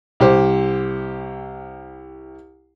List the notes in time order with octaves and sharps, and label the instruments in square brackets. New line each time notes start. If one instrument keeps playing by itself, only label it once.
[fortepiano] C2 G4 C5